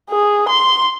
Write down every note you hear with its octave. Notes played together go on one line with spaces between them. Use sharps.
G#4
C6